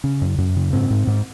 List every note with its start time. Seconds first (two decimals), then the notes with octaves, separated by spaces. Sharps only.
0.04 C#3 C#4
0.22 F#2
0.38 F#2
0.56 C#3
0.73 G#2 C4
0.90 G#2
1.07 G#2